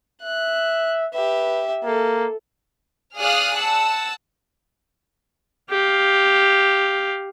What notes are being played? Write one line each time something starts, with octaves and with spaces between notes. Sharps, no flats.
E5 F#6
G4 B4 E5
A#3 A4
G#4 D5 F5 D#6 F6 F#6
F#5 A5 E6
G4 F5